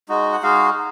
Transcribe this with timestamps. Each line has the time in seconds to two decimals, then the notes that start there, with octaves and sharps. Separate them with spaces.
0.09 G#3 D#4 F#4
0.33 F#5
0.43 G#3 D#4 F#4 F5